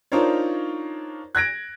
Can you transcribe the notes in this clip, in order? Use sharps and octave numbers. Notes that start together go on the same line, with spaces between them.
D4 D#4 F4 A#4 C5 C#5
F#6 G#6 A#6 D7